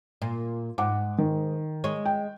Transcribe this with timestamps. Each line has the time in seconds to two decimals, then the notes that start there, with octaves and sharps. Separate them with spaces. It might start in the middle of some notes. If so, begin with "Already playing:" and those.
0.22 A#2
0.78 G#2 F#5 D6
1.18 D#3
1.84 G#3 C#5
2.05 G5